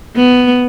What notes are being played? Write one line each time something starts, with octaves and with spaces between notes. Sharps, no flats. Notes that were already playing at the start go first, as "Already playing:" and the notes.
B3